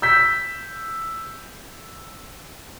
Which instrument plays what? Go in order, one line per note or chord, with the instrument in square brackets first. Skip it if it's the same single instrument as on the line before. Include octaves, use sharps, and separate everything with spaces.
[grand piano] E6 G6 B6